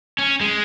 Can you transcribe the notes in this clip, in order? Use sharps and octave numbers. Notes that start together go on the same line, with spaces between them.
C#4
G#3